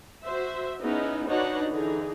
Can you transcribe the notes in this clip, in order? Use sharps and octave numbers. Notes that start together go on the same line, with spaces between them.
F#4 C5 E5
B3 C#4 D#4 E4 G#4
D4 D#4 F#4 B4 C#5 F#5
D3 E3 D#4 G#4